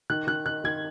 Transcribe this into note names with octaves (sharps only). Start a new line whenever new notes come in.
D#3 F#6
D#3 F#6
D#3 F#6
D#3 G#6